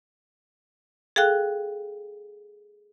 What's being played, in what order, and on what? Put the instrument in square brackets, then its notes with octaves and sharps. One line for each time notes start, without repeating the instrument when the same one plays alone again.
[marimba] G#4 A4 F5 G5 F#6